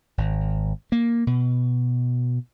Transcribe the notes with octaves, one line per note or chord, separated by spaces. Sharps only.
G#1
A#3
B2